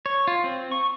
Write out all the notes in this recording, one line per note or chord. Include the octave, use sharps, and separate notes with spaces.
C#5
F4
C4
C#6